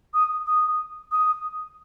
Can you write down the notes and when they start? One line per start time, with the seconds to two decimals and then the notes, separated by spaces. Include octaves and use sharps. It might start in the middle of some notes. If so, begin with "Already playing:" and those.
0.14 D#6
0.46 D#6
1.11 D#6